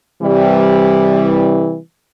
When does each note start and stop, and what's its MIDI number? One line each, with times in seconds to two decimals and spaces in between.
0.22 1.78 48
0.22 1.78 52
0.22 1.78 55